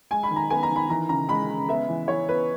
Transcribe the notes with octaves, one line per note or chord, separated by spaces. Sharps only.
G#3 G#5
B5
D#3
A#5
B3 G#5
A#5
D#3
B5
E3 A#5
C#3 A#5
G#3 B5
C#3
B3 E5
E3
E3 C#5
B3 B4